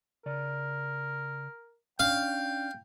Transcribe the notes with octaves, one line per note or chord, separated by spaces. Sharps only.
C#3 A#4 D5
C#4 D4 F5 G5